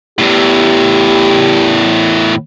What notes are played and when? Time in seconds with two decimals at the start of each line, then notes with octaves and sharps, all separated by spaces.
0.19 E2 A2 G4